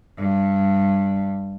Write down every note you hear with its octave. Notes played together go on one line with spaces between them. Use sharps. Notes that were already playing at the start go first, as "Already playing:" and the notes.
G2